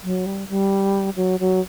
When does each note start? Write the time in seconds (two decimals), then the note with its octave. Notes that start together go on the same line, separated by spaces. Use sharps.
0.04 F#3
0.26 G3
0.49 G3
1.16 F#3
1.40 F#3